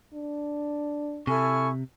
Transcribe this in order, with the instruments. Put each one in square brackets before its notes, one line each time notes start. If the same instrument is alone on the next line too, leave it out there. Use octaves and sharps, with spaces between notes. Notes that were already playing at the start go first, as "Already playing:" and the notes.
[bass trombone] D4
[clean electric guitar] C3 [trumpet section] E4 C#6 [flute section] A4 G#5 F6